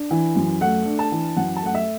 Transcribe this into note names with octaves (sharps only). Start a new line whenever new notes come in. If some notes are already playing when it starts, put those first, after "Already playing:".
Already playing: D4
E3
F#2
A3 F#5
D4
A5
E3
F#2 F#5
A5
A3 F#5
E5